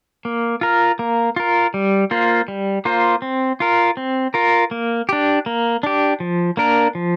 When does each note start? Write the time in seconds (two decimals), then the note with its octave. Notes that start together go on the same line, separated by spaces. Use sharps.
0.25 A#3
0.61 F4 A#4
0.99 A#3
1.36 F4 A#4
1.74 G3
2.11 A#3 F4 C5
2.48 G3
2.85 A#3 F4 C5
3.22 C4
3.60 F4 A#4
3.97 C4
4.34 F4 A#4
4.71 A#3
5.09 D4 G4
5.46 A#3
5.83 D4 G4
6.20 F3
6.57 A#3 D4 A#4
6.95 F3